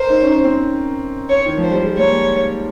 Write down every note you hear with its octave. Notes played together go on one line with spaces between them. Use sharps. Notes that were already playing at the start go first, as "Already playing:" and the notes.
Already playing: A#4 C5
D#4
C#4
D#4
C4
C#5
D#3
F3
C5
G3
G#3
A#3 C#5